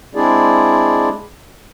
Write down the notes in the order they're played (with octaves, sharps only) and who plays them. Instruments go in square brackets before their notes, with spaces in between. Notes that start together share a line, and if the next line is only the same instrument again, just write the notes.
[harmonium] G#3 C4 D4 E4 G#4 D5